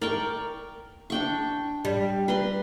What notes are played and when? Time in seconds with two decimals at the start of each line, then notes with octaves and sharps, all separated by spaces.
0.02 A#4 D5 G5 C#6
1.10 D4 G5 C#6
1.85 G3
2.28 B4 A#5 C6